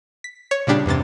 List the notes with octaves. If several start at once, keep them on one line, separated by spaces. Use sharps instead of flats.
B6
C#5
A#2 C#3 G3 D4 G4
E2 G2 C3 A6